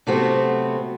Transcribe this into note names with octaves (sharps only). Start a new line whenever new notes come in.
C3 F#3 A3 B3 C4 F#4